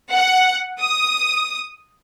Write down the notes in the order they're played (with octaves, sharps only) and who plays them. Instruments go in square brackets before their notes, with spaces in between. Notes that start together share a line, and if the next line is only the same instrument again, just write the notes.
[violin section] F#5
D#6